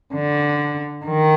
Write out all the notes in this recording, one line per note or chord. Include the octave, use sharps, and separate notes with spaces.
D3
D#3